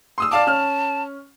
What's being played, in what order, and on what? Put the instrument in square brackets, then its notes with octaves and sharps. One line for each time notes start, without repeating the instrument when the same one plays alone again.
[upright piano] C6 D#6 E6
[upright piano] D5 F5 D6 [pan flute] A5
[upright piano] C#4 F6